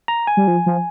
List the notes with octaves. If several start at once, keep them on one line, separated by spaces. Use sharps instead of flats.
A#5
G#5
G3
F3
F3